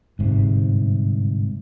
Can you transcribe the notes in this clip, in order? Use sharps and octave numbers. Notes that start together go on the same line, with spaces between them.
G1 G#2 C3